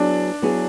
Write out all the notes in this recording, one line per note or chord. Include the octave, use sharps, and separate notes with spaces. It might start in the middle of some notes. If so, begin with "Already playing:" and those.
Already playing: F#3 B3 D4 E4 G#4
F#3 B3 E4 G#4